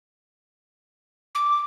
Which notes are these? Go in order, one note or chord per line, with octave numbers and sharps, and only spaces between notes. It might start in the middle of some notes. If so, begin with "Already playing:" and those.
D6